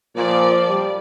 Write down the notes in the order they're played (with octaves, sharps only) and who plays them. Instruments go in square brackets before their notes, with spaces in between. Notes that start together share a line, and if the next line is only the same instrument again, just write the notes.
[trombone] A#2 [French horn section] F3 [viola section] D5
[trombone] G3